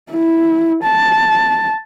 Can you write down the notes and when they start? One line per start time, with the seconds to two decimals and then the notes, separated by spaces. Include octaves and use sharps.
0.12 E4
0.83 A5